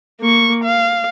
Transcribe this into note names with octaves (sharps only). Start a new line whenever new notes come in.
A#3 C#6
F5